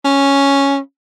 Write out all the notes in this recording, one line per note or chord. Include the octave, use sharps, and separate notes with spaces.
C#4